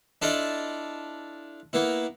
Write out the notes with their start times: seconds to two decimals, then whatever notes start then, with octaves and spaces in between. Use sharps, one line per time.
0.22 D4 E4 F4 A4 D5 D#5
1.73 A#3 B3 E4